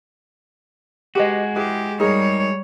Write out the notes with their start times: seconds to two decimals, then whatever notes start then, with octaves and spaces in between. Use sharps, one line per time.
1.15 G#3 F#4 G4 B4 D#5
1.56 E4 G4 G#4 B4
2.00 G3 D#4 G#4 A#4 C#5